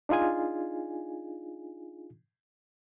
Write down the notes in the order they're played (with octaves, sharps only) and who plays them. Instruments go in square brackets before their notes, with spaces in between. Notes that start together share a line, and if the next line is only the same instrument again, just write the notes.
[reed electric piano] D4 D#4 F4 G#4 G#5